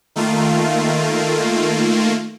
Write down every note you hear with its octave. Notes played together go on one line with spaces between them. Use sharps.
D#3 A3 A#3 F4